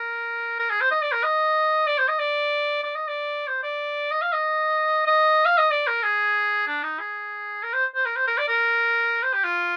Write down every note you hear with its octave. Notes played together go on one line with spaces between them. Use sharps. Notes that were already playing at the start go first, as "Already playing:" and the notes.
Already playing: A#4
A#4
G#4
C5
D#5
D5
A#4
D#5
D5
C5
D#5
D5
D5
D#5
D5
C5
D5
D#5
F5
D#5
D#5
F5
D#5
D5
A#4
G#4
D4
D#4
G#4
A#4
C5
C5
A#4
C5
A#4
D5
A#4
C5
G4
F4